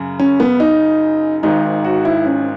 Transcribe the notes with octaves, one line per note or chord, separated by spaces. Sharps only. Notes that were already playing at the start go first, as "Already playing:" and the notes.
Already playing: F#2 C#3
C#4
B3
D#4
G#1 G#2 D#3 D#4
F#4
E4
C#4